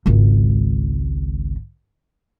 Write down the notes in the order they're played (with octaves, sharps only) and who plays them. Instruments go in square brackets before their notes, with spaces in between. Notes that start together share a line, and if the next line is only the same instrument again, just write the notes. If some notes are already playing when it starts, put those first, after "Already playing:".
[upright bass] G#1 C#2